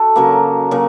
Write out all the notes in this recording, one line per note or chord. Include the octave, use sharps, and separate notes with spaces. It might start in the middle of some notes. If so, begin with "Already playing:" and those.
Already playing: F#4 A4
C#3 F#3 A#3
C#3 F#3 A#3